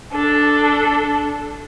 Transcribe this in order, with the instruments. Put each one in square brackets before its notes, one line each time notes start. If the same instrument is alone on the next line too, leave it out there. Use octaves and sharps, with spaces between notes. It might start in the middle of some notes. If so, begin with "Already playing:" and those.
[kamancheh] D4 A4